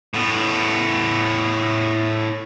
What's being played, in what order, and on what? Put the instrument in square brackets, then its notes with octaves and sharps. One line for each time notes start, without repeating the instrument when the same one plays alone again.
[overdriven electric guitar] A2 B3